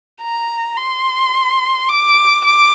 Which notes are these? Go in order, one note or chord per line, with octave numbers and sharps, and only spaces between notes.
A#5
C6
D6
D6